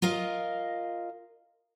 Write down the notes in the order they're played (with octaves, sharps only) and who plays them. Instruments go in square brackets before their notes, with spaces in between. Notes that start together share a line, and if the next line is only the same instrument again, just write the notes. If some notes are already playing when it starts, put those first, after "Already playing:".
[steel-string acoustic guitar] F4 A#4 D#5 F5